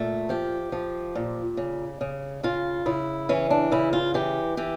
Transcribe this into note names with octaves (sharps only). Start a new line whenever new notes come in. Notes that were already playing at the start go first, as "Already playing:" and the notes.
Already playing: A#2 A3
F3 G4
F3
A#2
C#3
C#3
C#3 F4
C#3 E4
E3 C#4
D4
C#3 E4
F4
E3 G4
E3 G4